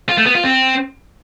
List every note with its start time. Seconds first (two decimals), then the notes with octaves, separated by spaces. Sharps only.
0.09 F4
0.18 A3
0.26 B3
0.35 F4
0.44 C4